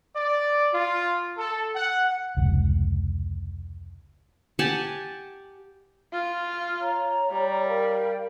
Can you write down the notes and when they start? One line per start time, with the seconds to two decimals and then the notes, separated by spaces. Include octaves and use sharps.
0.16 D5
0.73 F4
1.37 A4
1.75 F#5
2.37 F1 C#2
4.59 G4 F#5 G#5 A5
6.13 F4
6.80 C#5 A#5
7.31 G3
7.66 A#4 F5 G5